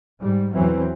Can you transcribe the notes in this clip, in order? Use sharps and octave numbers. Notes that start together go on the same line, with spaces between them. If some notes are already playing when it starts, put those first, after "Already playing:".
G#2 G3
E2 B2 E3 F#3 C4